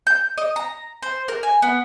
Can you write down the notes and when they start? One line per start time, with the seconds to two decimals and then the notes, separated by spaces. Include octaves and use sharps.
0.07 G6
0.38 D#5
0.56 A#5
1.02 C5
1.28 A#4
1.43 G#5
1.62 B3